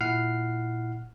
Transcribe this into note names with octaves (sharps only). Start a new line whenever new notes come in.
A#2 E4 F#5 F6 C7